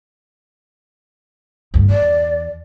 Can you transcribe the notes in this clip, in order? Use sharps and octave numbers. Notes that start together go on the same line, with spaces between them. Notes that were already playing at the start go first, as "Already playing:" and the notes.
D2 G2
E2 D5